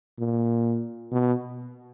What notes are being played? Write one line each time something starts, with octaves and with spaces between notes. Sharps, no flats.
A#2
B2